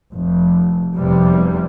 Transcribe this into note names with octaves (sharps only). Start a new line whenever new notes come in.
F1
F1 E2 C3 G3